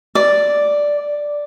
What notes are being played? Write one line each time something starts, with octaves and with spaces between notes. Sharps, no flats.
D5